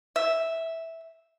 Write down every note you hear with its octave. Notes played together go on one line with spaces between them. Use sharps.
E5